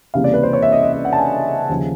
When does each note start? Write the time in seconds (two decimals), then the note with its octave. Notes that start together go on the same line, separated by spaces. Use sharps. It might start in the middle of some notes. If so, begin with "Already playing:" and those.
0.14 C#2 C3 E3 G3 A#3 F5
0.24 D5
0.34 B4
0.43 C5
0.53 C#5
0.62 E5
0.72 D#5
0.82 D#5
0.92 E5
1.05 F#5
1.13 A5
1.18 G#5
1.69 D#2 C#3 F3